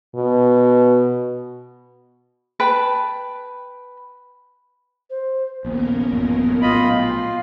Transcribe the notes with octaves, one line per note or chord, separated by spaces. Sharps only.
B2
B4 G5 A5 B5
C5
A#1 D#2 A#3 B3 C#4 A#4
A1 F#2 A#2
A#1 A2 F#3 F4 D#5 G5 B5 C6
F4 C7